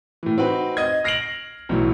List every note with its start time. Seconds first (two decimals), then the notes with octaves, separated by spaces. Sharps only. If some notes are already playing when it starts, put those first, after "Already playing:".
0.23 A2 E3
0.38 C4 D#4 F#4 B4 G5
0.77 D#5 G#6
1.04 F6 A#6 C7 D7 F7 F#7
1.69 B1 A2 E3 F#3